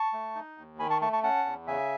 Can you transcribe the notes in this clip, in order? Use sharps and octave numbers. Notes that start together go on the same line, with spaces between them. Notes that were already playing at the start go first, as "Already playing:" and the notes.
Already playing: A5 C#6
A3
D#4
D#2
D#3 G#5 B5
A5 C#6
A3 A5 C#6
A5 C#6
C#4 F#5 A5
E2
C#3 E5 G#5